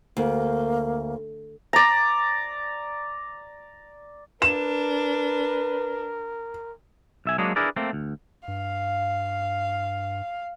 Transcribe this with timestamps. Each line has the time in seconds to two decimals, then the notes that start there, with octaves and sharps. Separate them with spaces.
0.17 D2 A#3
1.73 D5 A#5
4.42 D4 A#4 B4 E7
7.26 B1 E5 G#5
7.38 F#3 G#3 A#3 D4 G#4
7.56 D4 E4 G#4 A#4 B4 D5
7.76 A3 A#3 C4
7.93 D2
8.48 G2 F5